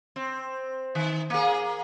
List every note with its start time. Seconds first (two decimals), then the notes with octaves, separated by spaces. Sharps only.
0.16 C4
0.95 D#3
1.30 A#3 G#4